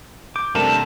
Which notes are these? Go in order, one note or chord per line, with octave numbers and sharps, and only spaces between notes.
D6 G6
F2 C3 G3 A3 D4 A4 A#4